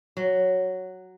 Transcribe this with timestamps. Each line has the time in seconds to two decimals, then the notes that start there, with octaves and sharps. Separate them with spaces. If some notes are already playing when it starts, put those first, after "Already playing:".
0.17 F#3